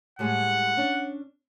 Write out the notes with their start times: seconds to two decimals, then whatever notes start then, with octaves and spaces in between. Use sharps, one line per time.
0.19 A2 G3 G#3 F#5
0.77 C#4 D4